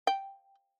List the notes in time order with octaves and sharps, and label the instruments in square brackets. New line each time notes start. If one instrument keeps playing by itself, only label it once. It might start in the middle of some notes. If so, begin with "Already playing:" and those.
[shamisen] G5